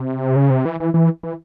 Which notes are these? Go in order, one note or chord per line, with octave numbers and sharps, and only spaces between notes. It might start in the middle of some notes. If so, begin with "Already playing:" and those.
Already playing: C3
C#3
C3
E3
E3
E3
E3